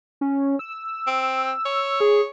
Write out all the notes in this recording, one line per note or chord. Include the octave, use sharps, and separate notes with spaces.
C#4
E6
C4
C#5
G#4